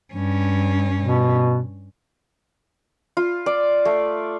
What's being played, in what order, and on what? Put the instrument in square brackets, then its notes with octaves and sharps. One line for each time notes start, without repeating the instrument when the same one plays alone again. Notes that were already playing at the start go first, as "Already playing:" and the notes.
[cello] G2 C#4
[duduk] B2
[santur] F4
D5
A3